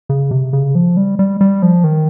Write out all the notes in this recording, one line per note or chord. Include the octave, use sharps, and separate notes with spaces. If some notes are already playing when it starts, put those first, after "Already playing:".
C#3
C3
C#3
F3
G3
G3
G3
F3
D#3